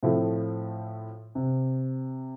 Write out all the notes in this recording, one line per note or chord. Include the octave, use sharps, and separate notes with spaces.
A2 F3 A3 C4 E4
C3